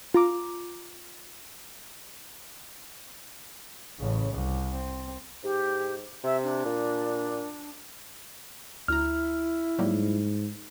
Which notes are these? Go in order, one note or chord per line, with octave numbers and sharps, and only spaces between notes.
F4 A#5 D6
A1 C#3
C2
C4
G#2 G4
C3 E5
D4
A#2
D2 E4 A#5 F6
G#2 F#3 G3 A#3